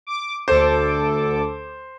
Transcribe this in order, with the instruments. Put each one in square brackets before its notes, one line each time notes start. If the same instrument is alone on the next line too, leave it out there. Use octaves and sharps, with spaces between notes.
[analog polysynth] D6
[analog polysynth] D2 A4 D6 [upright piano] C5